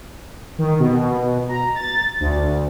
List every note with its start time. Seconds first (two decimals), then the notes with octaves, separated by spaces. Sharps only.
0.59 D#3
0.80 B2
1.49 A#5
1.75 A6
2.20 D2